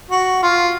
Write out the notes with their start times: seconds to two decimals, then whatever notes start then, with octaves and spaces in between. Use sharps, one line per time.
0.11 F#4
0.43 F4